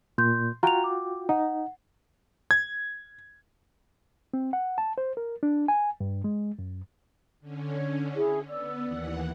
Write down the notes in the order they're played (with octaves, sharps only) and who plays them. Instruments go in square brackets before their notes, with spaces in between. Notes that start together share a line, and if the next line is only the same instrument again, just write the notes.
[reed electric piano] A#2 [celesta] C6 G6
[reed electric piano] F4 F#4 G5 [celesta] A#5 F7
[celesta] D6
[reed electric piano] D#4 [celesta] F#5
[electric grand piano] G#6
[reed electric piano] C4
F#5
A5
C5
A#4
D4
G#5
G2
G#3
F#2
[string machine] D3 C#4
[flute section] C#5
E4 G#4
[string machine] B3 [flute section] D5 E6
[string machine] D#2 E3 F#5